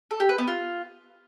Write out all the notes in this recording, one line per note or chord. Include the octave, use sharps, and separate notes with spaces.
A4
G4
B4
B3
F4